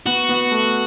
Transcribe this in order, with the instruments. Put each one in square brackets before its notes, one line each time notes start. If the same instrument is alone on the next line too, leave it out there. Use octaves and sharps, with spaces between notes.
[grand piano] B3 [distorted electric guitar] F#4
[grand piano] B3
A3